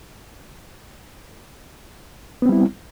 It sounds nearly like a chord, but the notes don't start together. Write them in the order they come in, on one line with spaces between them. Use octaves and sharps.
B3 C4 G3 E4